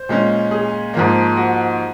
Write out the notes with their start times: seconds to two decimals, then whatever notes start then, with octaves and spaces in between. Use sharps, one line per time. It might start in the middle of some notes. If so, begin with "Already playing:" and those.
Already playing: C5
0.09 A#2 G#3 C#4
0.51 G#4
0.94 G#2 F3 A#3
1.37 F#4